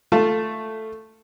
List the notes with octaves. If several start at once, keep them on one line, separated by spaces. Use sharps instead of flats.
A3 F4 A5